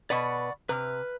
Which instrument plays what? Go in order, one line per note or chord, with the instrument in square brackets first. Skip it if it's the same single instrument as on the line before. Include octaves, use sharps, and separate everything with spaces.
[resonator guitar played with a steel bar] B2 B4 [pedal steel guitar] D5 F#5 C#6
[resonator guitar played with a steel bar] C3 [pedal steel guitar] B4 F6